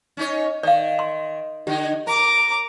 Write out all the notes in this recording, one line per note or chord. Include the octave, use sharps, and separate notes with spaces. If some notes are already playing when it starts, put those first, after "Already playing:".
C#4 D#4 C#5
D#3 D5 F5
C6
D3 D#4 G4
A#4 A#5 D6